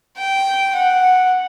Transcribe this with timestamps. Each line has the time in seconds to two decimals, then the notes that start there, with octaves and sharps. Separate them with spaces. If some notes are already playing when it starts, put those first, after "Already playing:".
0.18 G5
0.76 F#5